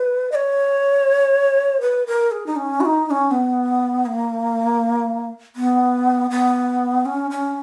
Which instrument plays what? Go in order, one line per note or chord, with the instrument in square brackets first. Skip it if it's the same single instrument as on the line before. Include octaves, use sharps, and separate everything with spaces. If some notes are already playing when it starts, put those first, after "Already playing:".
Already playing: [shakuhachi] B4
D#5
C#5
B4
A#4
G#4
D#4
C#4
F#4
D#4
D#4
C#4
B3
A#3
B3
B3
C#4
C#4